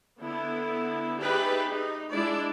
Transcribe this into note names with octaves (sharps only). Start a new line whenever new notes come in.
D3 B3 E4
D#4 G4 G#4 B4 D5 E5
D#4
G#3 D4 E4 D5